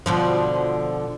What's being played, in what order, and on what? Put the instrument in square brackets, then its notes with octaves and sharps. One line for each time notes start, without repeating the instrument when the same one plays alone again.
[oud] B2 D3 F3